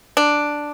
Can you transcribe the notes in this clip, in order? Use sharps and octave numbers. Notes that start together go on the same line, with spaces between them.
D4